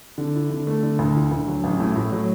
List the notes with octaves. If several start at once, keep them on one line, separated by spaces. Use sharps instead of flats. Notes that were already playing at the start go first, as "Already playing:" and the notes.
D3
E4
D3
A3
D3
D2
E4
D2
F#3
A1
A2
A2
F#3